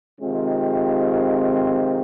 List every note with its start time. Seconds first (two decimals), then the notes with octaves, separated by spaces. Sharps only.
0.20 C3 D#3 G#3 C4 F4